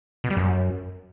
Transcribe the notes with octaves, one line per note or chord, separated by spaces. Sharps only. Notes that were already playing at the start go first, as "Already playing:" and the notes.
B2
G3
F#2